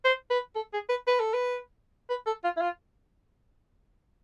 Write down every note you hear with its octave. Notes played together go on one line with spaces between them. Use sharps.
C5
B4
A4
G#4
B4
B4
A4
B4
B4
A4
F4
E4
F4